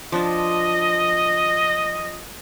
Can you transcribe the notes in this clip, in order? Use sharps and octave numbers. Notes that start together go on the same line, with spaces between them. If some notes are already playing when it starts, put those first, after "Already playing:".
F3 D4 F4 D#5